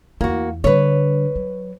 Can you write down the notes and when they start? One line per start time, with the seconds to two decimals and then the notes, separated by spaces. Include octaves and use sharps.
0.21 E2 A#3 E4 F#4
0.64 D3 G3 B4 C#5
1.36 F#3